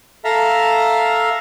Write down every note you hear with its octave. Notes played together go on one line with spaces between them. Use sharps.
A4 E5 F5 A#5